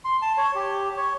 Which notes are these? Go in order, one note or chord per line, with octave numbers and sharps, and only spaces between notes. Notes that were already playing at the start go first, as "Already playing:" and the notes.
C6
A5
C#5
G4
C#5